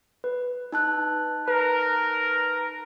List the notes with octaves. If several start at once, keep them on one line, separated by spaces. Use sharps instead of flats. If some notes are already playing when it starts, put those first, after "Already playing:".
B4
D#4 A5 F#6
A#4 B4